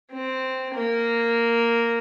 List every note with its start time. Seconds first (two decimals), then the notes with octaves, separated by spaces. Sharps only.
0.11 C4
0.74 A#3